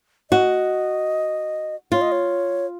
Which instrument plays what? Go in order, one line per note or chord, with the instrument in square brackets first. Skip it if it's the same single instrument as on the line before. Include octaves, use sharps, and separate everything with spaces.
[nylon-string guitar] F#4 [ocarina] D#5
[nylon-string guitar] F4 [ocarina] C#5
[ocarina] D#5
C#5